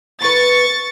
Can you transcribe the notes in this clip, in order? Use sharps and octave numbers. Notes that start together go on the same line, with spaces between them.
E2 B4 C#6 A6